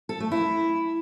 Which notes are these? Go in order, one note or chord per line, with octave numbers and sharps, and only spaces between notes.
A4
A3
E4